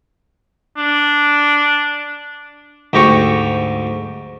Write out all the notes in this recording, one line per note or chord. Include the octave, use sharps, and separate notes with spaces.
D4
D2 G#2 G4 A#5 C#6